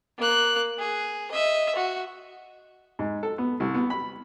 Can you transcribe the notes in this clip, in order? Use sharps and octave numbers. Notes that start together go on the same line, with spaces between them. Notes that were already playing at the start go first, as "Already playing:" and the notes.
A#3 F#6
G#4
D#5 E5
F#4
G#2
A4
B3
C2
B3
B5